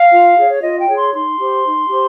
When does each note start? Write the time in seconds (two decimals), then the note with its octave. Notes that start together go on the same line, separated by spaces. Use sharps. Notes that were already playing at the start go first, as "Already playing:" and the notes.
Already playing: F5
0.11 F4
0.36 G#4 C#5
0.49 C#5
0.62 F4 D#5
0.80 G5
0.88 G#4 C#5
0.96 C6
1.13 D#4 C6
1.39 G4 C5
1.65 D#4
1.90 G4 C5